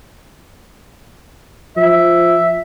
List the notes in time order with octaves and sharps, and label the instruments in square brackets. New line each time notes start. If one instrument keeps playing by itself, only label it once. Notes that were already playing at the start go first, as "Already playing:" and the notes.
[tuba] F3 [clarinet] E5